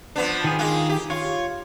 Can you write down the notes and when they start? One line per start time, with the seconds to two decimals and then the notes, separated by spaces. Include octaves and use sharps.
0.16 F3 B3 D4
0.44 D#3 G#4
0.59 G#3 A#3 F4
0.89 G4
1.10 F4 C#5